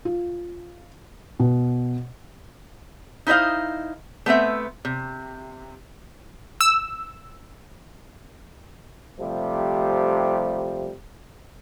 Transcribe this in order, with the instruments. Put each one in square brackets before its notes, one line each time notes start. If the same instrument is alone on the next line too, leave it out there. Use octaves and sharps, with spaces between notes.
[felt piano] F4
B2
[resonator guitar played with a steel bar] D#4 E4 C5 D#5 F5
A3 B3 C4 E5
C3
[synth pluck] E6
[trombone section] C3 F3 G3 A3